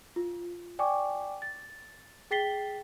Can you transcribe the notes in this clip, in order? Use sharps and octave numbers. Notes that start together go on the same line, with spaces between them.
F4
D5 G5 G#5 C#6 D6
A6
G#4 G5 A6 B6 C7 G7